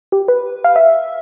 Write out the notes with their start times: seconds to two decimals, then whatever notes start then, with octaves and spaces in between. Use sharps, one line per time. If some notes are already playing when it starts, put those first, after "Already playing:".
0.12 G4
0.28 B4
0.64 F5
0.76 E5